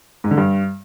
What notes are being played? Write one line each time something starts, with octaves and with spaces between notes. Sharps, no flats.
G#2
D3
G2